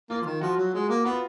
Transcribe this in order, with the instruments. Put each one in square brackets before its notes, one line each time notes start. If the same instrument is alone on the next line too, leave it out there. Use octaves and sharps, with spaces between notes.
[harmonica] A#3 [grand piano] F4
[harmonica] F3
D#3
[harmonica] F3 [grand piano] F#4
[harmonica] F#3
G#3
A#3
[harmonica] B3 [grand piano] F4